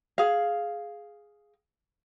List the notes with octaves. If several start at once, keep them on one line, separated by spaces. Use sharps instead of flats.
G#4 F5